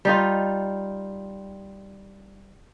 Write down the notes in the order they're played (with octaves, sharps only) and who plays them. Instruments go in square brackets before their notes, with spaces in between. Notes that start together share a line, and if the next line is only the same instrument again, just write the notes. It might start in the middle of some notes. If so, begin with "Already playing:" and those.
[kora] G3 D#4 F4